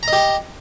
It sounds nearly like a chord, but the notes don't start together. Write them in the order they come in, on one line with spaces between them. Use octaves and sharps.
A#5 D#5 G4